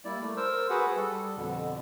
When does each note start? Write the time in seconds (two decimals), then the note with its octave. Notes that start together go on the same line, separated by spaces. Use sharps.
0.05 G3 A#3 E4 D5
0.21 A3
0.37 A#4 C5 E6
0.70 F#4 G#4 B4 F#5
0.96 G3 A4
1.37 F2 B2 D3